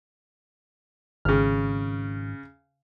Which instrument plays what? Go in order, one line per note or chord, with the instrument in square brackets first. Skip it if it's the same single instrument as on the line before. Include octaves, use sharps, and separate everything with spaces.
[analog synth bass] G#1 [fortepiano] C#3 F6